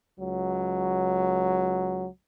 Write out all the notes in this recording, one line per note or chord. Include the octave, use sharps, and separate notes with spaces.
C#2 F#3